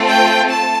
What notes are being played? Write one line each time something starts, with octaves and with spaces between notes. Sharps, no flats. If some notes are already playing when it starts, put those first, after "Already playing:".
Already playing: A3 C4 F4 A4
G5
A5